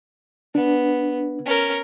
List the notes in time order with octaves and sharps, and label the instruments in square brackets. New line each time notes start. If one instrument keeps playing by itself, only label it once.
[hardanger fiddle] B3 [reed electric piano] D4
[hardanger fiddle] C#4 A#4